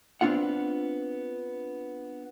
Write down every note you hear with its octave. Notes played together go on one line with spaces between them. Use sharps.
B3 C4 D4 F4 F#5